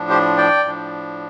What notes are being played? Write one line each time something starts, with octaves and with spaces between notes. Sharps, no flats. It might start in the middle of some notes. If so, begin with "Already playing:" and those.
Already playing: A2 F3 D4
G4 C5
D5 G5
A2 F3 D4